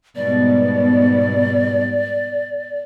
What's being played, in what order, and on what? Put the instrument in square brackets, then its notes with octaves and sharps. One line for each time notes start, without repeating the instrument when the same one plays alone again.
[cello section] G#2 B2 G3 [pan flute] D5